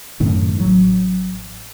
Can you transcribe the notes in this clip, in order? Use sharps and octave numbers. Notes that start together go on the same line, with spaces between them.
F#2 A2 C3 D#3
A1 F#3